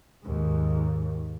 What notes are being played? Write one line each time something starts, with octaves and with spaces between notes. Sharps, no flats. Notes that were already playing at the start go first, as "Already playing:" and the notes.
D#2 G#2